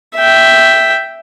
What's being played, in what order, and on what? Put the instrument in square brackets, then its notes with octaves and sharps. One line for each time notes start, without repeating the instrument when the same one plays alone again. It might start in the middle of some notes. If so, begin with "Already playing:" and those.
[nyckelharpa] E5 G5